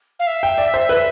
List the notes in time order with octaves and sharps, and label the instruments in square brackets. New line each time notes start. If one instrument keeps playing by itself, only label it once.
[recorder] F5
E5
[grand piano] G5
D5
C5
B4